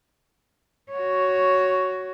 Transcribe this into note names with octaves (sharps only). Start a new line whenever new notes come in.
F#4 C#5